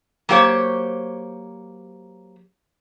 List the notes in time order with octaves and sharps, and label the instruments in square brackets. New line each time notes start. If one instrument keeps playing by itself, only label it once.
[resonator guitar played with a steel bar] F#3 A#3 G4 C5 C#5